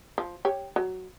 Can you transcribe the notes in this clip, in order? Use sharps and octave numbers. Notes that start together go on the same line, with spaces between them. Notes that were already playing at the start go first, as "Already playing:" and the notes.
F3
G4 C#5
F#3